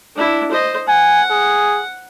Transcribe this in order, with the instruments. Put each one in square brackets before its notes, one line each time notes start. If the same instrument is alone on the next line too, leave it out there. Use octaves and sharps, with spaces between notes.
[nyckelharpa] D4 E4
C5 D#5
[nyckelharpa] F#5 [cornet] G#5
[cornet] G#4